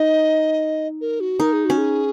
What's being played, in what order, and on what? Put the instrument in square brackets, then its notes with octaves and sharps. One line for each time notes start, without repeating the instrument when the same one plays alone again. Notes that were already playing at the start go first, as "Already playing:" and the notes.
Already playing: [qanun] D#4 [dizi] D#5
[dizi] A#4
F#4
[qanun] D#4 [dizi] A#4
[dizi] G#4
[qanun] C#4 [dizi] F#4
[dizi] G#4